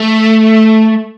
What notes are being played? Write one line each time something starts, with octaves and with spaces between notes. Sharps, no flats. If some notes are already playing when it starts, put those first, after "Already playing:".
Already playing: A3